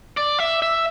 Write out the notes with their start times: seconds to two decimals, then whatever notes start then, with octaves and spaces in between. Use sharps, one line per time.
0.17 D5
0.39 E5
0.62 E5